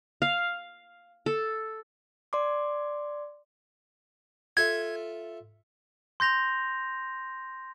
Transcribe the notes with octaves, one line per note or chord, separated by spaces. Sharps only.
F5
A4
D5 C6 D6
F4 A4 E5 G#6
C6 G6 A#6 F7